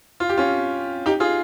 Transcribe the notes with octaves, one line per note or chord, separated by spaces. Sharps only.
F4
G4
C#4 F4
D#4 G4
F4 G#4